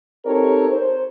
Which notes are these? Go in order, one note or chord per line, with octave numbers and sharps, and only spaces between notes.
C4 D#4 G4 A4 A#4 C#5
C5